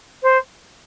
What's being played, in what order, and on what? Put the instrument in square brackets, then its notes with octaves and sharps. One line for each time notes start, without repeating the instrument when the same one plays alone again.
[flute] C5